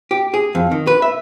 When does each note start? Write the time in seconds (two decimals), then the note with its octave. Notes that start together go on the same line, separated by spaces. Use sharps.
0.11 G4
0.34 G#4
0.55 F2
0.71 D#3
0.87 B4
1.02 E5